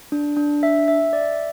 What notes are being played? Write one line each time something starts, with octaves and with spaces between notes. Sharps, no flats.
D4
D4
E5
E5
D5